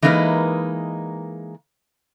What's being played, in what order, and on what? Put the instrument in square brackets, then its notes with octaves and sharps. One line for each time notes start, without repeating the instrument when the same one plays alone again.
[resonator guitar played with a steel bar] E3 G#3 A#3 D#4 A#4 B4